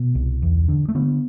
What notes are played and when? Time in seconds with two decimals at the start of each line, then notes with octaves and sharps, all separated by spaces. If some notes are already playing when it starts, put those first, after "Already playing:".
Already playing: B2
0.15 C2
0.42 E2
0.68 D3
0.89 A3
0.95 D3 B3